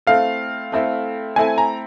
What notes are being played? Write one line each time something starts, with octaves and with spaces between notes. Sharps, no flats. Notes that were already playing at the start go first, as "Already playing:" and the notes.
A3 C4 E4 A4 F5
A3 C4 E4 A4
A3 C4 E4 A4 G#5
A#5